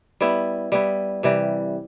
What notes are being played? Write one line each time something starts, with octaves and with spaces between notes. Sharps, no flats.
G3 B3 E4
G3 B3 E4
C3 E3 G3